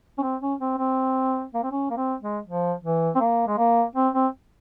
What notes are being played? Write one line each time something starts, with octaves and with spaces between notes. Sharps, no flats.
C#4
C4
C#4
C4
C4
A#3
C4
C#4
A#3
C4
G#3
F3
E3
C4
A#3
G#3
A#3
C4
C4